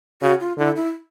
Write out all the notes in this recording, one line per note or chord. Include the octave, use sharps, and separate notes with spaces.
C#3 F#4
F4
D3 E4
E4